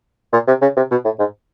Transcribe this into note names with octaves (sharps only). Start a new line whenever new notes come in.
A#2
C3
C#3
C3
B2
A2
G#2